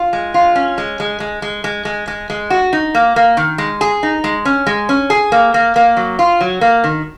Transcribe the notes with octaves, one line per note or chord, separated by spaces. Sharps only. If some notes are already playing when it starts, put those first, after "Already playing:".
Already playing: F4
G#3
F4
C#4
G#3
G#3
G#3
G#3
G#3
G#3
G#3
G#3
F#4
D#4
A#3
A#3
D#3
G#3
G#4
D#4
G#3
C#4
G#3
C#4
G#4
A#3
A#3
A#3
F#3
F4
F#3
A#3
D#3